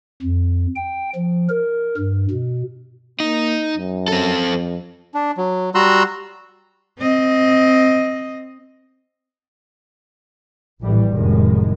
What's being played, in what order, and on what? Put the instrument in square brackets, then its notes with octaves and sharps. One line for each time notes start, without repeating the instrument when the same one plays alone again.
[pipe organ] F2
G5
F3
A#4
G2
B2
[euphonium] A#3 [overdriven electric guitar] D#4
[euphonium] F#2
[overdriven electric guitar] C4 A4
[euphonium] F2
[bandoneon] D4
F#3
G3 F#4 A#5 C6 E6 F#6
[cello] C4 D#5
[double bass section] A#1 A2 E3 G3
F1 F#2 A2 D#3 G#3